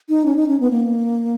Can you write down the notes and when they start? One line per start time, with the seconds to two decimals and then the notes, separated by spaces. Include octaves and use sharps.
0.09 D#4
0.26 C#4
0.36 D#4
0.48 C#4
0.60 B3
0.71 A#3